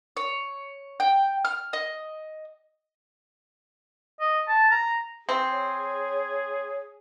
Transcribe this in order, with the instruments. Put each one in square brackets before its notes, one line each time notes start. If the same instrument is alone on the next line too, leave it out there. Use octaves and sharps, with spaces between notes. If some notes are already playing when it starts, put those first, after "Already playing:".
[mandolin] C#5
G5
F6
D#5
[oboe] D#5
A5
A#5
[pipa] C4 [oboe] G#4
[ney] C#5